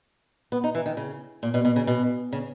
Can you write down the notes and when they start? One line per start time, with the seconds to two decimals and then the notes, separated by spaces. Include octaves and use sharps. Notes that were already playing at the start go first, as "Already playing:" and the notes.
0.52 B3
0.64 D#4
0.75 E3
0.86 D#3
0.97 C#3
1.43 A#2
1.54 B2
1.65 B2
1.76 C#3
1.87 B2
2.32 C#3